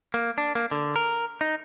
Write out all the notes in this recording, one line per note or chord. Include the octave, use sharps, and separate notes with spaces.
A#3
D4
A#3
D3
A#4
D#4